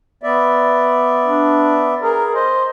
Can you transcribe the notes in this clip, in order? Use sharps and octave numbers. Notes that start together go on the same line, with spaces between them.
B3 D5 E5
D4
G#4 A#4
C5 D#5